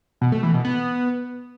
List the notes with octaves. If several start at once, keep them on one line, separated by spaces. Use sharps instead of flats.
B2
A3
E3
B2
B3